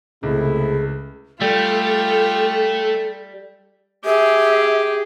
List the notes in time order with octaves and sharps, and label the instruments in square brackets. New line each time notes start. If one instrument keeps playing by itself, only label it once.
[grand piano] C#2 [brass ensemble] C3 A3 E4 [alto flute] G#4
[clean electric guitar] G3 [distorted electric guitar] A3 [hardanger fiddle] F4 G4 [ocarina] A4
[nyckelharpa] G4 G#4 [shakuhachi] E5